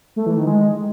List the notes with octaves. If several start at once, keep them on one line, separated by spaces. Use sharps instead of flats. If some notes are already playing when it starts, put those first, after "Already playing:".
A3
E3
D#3
G#3